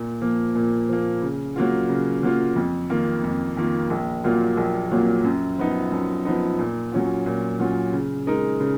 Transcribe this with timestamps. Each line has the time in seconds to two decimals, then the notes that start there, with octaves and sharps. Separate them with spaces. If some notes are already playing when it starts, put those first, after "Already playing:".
Already playing: A#2
0.21 F3 A#3
0.55 A#2
0.89 F3 A#3
1.22 C#3
1.56 F#3 A#3 F4
1.89 C#3
2.23 F#3 A#3 F4
2.56 F2
2.90 D#3 A#3 F4
3.24 F2
3.57 D#3 A#3 F4
3.90 A#1
4.24 A#2 F#3 A#3 F4
4.57 A#1
4.91 A#2 F#3 A#3 F4
5.24 F#2
5.58 F3 B3 D#4
5.92 F#2
6.25 F3 B3 D#4
6.59 A#2
6.92 F#3 C#4 F4
7.26 A#2
7.60 F#3 C#4 F4
7.93 C#3
8.27 G#3 D#4 A#4
8.60 C#3